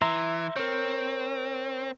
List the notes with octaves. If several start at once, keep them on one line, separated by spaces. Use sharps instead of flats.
E3 E5 A#5 C6
C4 A#4 C#5